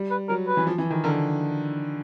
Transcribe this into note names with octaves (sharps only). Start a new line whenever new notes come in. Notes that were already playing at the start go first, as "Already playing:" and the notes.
Already playing: G3
B4
F#3 A#4
B4
E3
F3
E3
D#3
D3 A#4